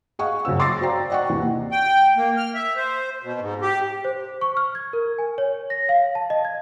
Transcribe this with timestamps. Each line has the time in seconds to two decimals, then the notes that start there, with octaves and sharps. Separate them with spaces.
0.19 G#4 D#5 F5 F#5 C#6
0.45 F#2 C#3 C4 E6
0.60 C6 D6 E6 A6 A#6 C7
0.81 F#4 C5 D5 F5 G5 A#5
1.10 D5 D#5 F#5 G5 C#6
1.29 D#2 C3 E3
1.72 G5
2.16 A#3
2.37 F6
2.54 E5
2.76 C5
3.23 B2
3.40 G#2
3.62 G4
4.05 C5
4.41 C#6
4.57 F6
4.75 G#6
4.93 A#4
5.18 G#5
5.38 C#5
5.70 A#6
5.89 F5
6.15 A5
6.30 D#5
6.45 G#6